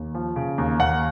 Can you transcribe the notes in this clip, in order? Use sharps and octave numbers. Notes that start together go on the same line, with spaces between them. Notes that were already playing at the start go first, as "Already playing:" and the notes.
Already playing: D#2
F3
C#3
D#2
D#2 F#5